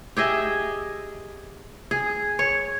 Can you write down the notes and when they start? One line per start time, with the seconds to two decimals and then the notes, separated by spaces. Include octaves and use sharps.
0.17 G4 G#4 D#5 E5
1.91 G#4
2.39 C#5